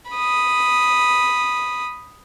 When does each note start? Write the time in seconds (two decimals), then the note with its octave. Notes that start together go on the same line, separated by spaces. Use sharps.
0.11 B5 D#6